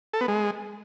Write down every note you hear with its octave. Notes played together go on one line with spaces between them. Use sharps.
A4
B3
G#3